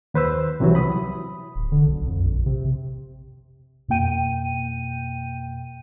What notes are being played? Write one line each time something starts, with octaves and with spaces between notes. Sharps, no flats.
D#2 B4 C5 E6
C2 C3 E3 F#3
B5 D#6
D1
D3
B1
F2
A#1
C3
F2 B2 A#3 G5 D#7